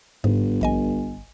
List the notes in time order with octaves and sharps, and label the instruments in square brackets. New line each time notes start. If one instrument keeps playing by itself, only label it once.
[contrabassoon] G1 [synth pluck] G#2
[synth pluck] A#1 D#5 G#5